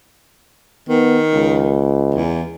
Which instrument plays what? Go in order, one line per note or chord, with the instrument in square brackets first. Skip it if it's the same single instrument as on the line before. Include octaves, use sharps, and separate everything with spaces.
[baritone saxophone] D#3 [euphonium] B3
[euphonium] C#2
[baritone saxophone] E2